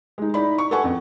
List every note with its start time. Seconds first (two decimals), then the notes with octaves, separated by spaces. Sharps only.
0.18 G#3 D#4
0.34 D#4 E4 D5 B5
0.58 C#6
0.71 A4 B4 F#5 G#5 C#6
0.84 F2